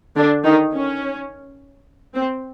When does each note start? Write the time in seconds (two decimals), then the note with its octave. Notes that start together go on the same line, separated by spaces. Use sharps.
0.16 D3 D4
0.45 D#3 D#4
0.73 C#4
2.15 C4